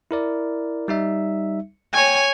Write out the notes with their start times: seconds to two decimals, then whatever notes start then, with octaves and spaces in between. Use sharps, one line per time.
0.11 E4 A#4 D5
0.88 G3 D#4 E5
1.94 C#5 G5 G#5